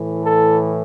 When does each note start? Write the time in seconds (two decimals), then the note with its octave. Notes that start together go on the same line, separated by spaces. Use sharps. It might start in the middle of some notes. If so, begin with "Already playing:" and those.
Already playing: A2 E3
0.24 A4